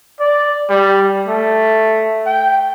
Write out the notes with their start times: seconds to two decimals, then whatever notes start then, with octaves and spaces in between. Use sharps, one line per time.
0.20 D5
0.70 G3
1.28 A3
2.26 G5